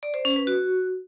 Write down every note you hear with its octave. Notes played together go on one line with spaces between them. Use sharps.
D5
C5
C#4
B4
F#4